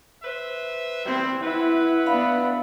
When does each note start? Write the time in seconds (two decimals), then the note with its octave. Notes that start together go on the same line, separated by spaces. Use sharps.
0.23 B4 C5 E5
1.06 G3 B3 C4 E4
1.43 E4 B4 E5 F#5
2.06 B3 D4 F5 B5